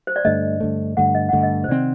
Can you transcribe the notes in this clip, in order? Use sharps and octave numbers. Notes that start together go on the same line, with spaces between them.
C5
D5
G2 D3 A3 D#5
G2 D3 A3
G2 D3 A3 F#5
D#5
G2 D3 A3 F#5
D#5
C5
C3 D#3 G3 C4 D5